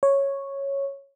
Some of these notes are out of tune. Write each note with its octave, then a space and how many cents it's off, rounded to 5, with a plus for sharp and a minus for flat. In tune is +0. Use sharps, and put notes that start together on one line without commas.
C#5 -5